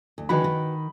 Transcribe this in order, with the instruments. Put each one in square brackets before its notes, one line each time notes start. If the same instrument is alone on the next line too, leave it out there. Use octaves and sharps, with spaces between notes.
[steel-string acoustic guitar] D2
[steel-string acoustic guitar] D3 D#3 G#3 [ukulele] F#4 B4 [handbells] B5
[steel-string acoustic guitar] D#3